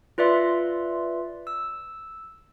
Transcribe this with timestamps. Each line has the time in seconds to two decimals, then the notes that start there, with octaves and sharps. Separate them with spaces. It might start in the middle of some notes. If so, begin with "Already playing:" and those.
0.18 F4 B4 D5 E5 C6
1.47 E6